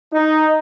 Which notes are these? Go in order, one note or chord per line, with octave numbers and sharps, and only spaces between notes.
D#4